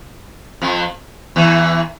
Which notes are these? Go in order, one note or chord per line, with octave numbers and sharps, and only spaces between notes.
F2 F3
E2 E3